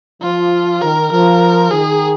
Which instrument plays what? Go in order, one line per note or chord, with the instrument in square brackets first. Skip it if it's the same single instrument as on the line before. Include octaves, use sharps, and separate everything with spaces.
[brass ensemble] F3 [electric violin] F4
[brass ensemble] D#3 [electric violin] A#4
[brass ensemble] F3 [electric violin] A#4
[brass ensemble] D#3 [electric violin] G#4